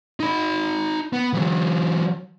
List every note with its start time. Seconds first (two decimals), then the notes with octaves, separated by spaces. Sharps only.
0.20 D#4 B5
1.13 B3
1.33 E3 F#3